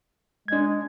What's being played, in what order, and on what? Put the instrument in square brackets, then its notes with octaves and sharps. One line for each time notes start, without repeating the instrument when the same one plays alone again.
[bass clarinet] G#3 [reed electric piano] D4 G#6